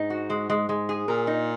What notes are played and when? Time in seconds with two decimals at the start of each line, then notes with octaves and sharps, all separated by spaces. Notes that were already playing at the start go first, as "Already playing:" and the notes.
Already playing: G#2 D#4
0.10 F#4
0.30 G#3
0.50 G#3
0.69 G#3
0.89 G#4
1.08 A#2 A#4
1.27 D#4